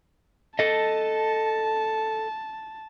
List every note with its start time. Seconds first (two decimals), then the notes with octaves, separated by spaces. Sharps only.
0.59 A4 D#5 A5